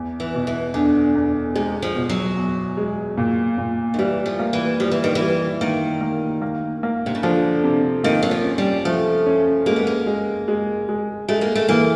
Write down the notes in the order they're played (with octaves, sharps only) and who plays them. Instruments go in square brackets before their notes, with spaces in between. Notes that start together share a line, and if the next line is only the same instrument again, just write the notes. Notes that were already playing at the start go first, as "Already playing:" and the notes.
Already playing: [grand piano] E2
[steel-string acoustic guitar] E3
[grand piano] B2
[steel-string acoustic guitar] E3
[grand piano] E2 [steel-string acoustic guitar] D3
[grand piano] E2
[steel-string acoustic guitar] C3 [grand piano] G#3
[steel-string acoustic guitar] F3
[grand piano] B2
[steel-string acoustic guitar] F#3
[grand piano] E2
G#3
A#2
A#2
[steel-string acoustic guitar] D#3
[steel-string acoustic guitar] E3 [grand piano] G3
[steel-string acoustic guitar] F3
[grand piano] A#3
[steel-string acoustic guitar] E3
[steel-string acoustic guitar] F3 [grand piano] G3
[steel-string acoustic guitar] E3
D#3
E3
[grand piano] G3
[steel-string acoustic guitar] D#3 [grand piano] A#3
[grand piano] A#3
A#3
A#3
[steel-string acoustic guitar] C3
C#3
[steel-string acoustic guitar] D3 [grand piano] F3
[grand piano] C3
[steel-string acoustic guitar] D#3 [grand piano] A#3
[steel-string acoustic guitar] F#3
F3
[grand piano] C#4
[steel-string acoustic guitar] G3
[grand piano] F3 [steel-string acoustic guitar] A3
[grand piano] C#4
[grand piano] G#3 [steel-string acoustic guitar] A#3
[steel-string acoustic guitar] B3
A#3
[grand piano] G#3
G#3
G#3
[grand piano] G#3 [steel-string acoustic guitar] A3
[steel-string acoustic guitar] A#3
A3
[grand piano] E3 [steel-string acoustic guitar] A#3